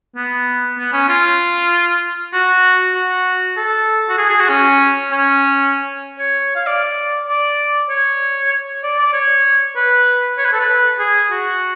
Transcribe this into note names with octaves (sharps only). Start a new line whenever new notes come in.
B3
B3
C#4
F4
F#4
F#4
A4
F#4
G#4
G#4
F#4
C#4
C#4
C#5
F5
D5
D5
C#5
D5
D5
C#5
B4
C#5
B4
A4
B4
G#4
F#4